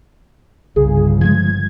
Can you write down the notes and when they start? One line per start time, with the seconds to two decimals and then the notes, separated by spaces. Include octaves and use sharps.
0.76 G1 C2 C#3 G#4
1.21 F3 G3 G#3 G#6